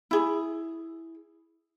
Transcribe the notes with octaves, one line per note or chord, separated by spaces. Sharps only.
E4 G#4